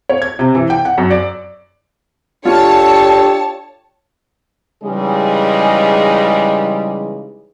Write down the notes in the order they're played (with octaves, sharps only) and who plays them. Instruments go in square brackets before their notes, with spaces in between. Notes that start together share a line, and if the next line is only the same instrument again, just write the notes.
[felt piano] C#5
G#6
C3
E3
G5
F#5
F#2
D5
[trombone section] D4 G4 [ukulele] F4 [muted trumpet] A4 [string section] C#5 A5
[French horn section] C#3 E3 G3 G#3 D#4 G#4